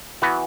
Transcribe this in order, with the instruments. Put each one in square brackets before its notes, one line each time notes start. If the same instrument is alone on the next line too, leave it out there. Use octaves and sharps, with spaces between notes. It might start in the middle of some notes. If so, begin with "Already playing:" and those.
[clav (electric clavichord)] E3 B3 F#4 B4